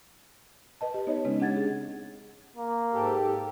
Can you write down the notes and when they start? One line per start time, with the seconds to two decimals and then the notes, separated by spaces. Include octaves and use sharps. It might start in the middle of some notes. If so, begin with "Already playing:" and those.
0.81 B4 D#5 A5
0.94 G4 B4
1.07 B3 D#4 C#5 D#5
1.25 C#3 G#3 C4 C#4
1.39 C4 D4 G4 F#5 G#6 A6
1.56 G#4
2.56 A#3
2.93 G#2 G4 A4